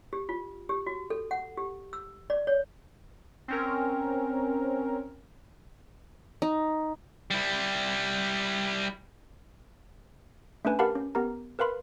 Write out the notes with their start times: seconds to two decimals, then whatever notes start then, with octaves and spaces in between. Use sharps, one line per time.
0.13 G4
0.29 F4
0.69 G4
0.87 F#4
1.10 A4
1.31 F#5
1.57 G4
1.93 E6
2.30 D5
2.47 C#5
3.48 C4 C#4 A#4
6.42 D#4
7.31 G3 E4
10.65 A3 C#4 D4 B4 G#5
10.79 G4 A#4 F5 F#5 A5 B5
10.95 C#4
11.15 B3 G4 A#4 A#5
11.59 A#4 B4 F5 B5 C6